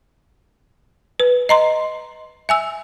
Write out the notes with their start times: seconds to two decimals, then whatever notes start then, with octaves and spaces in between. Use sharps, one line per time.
1.20 B4
1.49 D#5 A#5 C6
2.49 E5 G#5 E6